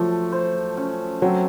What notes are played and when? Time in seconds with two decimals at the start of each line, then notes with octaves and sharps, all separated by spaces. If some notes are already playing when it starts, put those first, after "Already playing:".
Already playing: F3 F#3 A3
0.32 C5
0.77 C#4
1.22 F#3 C4